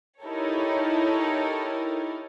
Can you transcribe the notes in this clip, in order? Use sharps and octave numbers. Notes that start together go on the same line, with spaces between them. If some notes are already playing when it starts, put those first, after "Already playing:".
D#4 E4 G4 A4 A#4 C#5